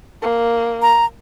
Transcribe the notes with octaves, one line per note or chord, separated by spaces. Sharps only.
A#3
A#5